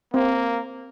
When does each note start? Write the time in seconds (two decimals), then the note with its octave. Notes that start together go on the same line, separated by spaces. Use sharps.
0.14 A#3 C4